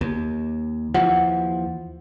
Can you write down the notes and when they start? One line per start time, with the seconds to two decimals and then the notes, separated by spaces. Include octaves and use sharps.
0.01 D#2
0.94 D#2 E3 F3 F#5